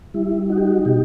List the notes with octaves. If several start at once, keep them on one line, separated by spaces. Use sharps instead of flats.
G3 E4
D#4 F#4
G4
F#4
B2 G4